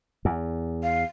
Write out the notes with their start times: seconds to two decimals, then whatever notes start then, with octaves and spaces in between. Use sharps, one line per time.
0.25 E2
0.83 F5